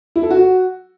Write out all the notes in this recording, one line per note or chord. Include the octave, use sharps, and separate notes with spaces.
E4
A4
F#4